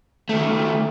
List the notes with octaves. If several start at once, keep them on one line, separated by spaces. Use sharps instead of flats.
D#3 A3